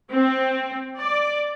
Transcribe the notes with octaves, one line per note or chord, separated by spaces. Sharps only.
C4
D5